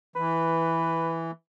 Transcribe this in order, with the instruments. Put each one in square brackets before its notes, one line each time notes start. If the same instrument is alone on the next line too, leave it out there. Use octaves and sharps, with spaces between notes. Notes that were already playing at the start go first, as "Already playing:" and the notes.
[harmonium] E3 [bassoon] B4